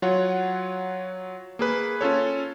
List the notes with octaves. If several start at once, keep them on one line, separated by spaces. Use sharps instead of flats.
F#3 F4 C#5 F#5
A#3 G#4 B4
C#4 F4 A4 C#5